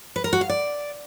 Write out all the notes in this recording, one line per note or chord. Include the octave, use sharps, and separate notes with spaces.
B4
A#4
F#4
F5
D5